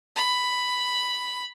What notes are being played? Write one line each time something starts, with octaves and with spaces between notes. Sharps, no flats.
B5